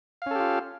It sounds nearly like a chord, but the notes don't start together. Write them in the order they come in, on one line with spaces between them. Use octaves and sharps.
F5 C#4 A4 G4 F4